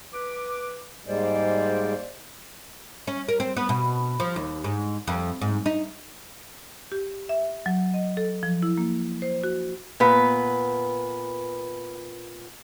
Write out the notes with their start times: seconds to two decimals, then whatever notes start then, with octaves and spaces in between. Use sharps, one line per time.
0.13 B4 D6
1.06 G#2 G3 G#3 A#3 C5 D5
3.07 C#4
3.28 A#4
3.40 C4
3.57 B3
3.69 B2
4.20 F3
4.36 D#2
4.64 G#2
5.08 F2
5.41 G#2
5.66 D#4
6.92 G4
7.29 E5
7.66 F#3
7.94 D#5
8.17 A4
8.43 F3
8.62 E4
8.78 A#3
9.22 C5
9.43 F#4
10.00 A#2 B3 B4